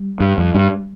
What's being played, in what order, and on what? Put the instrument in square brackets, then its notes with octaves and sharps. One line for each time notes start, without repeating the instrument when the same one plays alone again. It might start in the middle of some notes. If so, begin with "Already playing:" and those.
Already playing: [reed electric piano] G3
[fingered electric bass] G2
F2
G2